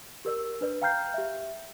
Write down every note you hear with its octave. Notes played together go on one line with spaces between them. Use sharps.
G4 A#4 D5 E6
D4 B4 D5
F5 G5 A#5 F6 G6 C7
G4 E5